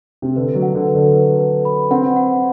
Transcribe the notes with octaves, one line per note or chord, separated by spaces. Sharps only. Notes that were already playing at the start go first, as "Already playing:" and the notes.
C3
D3 B4
F#3
F#5
D3
B4
D3
B4
B4
B5
C4 F#5
F#5